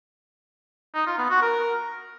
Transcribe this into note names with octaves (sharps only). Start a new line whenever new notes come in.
D#4
F4
B3
F#4
A#4